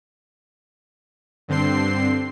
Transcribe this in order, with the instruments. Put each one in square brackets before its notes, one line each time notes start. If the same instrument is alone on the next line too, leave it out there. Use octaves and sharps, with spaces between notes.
[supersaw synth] G2 D3 C4 C6 C7